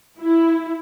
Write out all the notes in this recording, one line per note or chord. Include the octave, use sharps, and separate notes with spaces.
E4